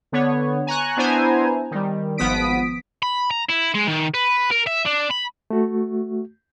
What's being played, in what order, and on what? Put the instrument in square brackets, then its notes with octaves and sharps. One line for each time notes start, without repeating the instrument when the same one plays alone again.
[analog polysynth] D3 B3 C#5
G#5 A#5 C#6 F#6
B3 D4 E4 C5 G#5 A#5
D#3 G3
G#1 F3 B3 D#6 B6 D7
[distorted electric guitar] B5
A#5
E4
G#3
D#3
B4
A#4
E5
D4
B5
[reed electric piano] A3 F#4